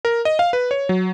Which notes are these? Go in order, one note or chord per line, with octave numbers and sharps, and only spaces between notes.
A#4
D#5
F5
B4
C#5
F#3